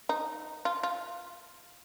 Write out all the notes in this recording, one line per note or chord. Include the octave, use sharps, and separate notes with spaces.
D#4
F4
F4